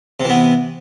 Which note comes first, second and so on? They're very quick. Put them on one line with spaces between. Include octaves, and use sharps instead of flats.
C3 E3 B3